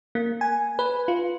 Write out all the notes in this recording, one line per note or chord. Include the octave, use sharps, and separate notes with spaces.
A#3
G#5
B4
F4